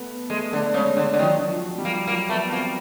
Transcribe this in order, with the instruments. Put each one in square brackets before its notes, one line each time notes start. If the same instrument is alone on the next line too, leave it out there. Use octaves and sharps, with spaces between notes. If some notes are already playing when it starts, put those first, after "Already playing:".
Already playing: [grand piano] A3 B3
[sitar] G#3 [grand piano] A3
[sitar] D3 [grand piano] A3
[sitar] C#3 [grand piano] G#3
[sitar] D3 [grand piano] A3
[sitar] D3
[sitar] D#3 [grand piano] F#3
[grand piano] F3
G3
[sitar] A#3
[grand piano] F#3 [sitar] A#3
[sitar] A3 [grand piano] B3
[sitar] A#3 [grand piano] C4